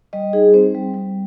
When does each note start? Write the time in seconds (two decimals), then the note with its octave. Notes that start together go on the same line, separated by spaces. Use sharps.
0.13 G3 D#5
0.33 D#4 G#4
0.54 C4 C5
0.75 G3
0.94 G3